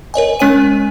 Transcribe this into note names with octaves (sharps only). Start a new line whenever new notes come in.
A#4 C#5 D#5 G#5
G#3 C#4 C#5 G#5 D#7